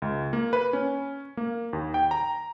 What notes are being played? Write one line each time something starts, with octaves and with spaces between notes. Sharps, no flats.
C#2
A#3
B4
C#4
A#3
D#2
G5
A#5